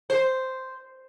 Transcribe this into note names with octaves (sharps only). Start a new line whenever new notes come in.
C5